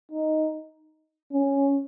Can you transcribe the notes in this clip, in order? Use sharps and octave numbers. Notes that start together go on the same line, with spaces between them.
D#4
C#4